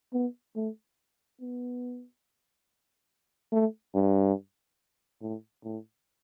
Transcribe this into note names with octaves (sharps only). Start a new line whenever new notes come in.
B3
A3
B3
A3
G2
A2
A2